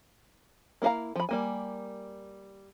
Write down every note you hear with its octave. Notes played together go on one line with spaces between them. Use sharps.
A#3 E4 A#4 F5 A#5
F3 B5
G3 A#3 G#5